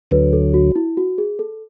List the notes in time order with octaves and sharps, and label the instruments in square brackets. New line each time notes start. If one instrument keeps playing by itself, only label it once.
[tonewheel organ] D2 D3 F#3 [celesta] B4
[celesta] A4
F#4
E4
F#4
G#4
A4